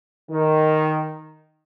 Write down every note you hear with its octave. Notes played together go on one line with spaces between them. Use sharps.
D#3